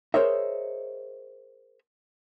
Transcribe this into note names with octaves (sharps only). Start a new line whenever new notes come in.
G#4 A#4 C5 C#5 D#5 E5